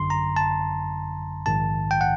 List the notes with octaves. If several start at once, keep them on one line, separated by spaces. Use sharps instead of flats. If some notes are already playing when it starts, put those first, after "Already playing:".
Already playing: G#1 F#2 D3 C6
A#5
A5
A#1 G#2 D#3 A5
G5
F#5